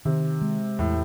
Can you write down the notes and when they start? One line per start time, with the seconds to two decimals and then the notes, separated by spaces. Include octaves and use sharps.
0.05 C3 D#3
0.42 G#3
0.79 E2 A2